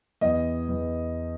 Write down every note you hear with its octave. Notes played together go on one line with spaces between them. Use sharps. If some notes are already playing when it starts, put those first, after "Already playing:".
E2 D#5
E2